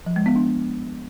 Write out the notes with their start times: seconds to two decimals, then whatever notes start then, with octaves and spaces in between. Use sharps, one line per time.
0.06 F3
0.16 G#3
0.26 B3
0.36 D4